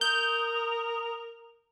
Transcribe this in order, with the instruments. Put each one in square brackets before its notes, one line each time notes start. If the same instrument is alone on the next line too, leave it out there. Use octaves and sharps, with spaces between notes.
[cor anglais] A#4 [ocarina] D#6 [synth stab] G6